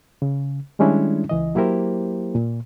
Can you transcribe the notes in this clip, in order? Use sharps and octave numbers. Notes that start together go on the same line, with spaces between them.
C#3
D#3 G3 G#3 C#4 D4 E4
C#2 E3 D#5
F#3 A#3 E4 G4 A#4 C5
A#2